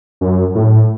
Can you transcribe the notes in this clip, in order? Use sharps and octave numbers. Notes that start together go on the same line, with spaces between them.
F#2
A2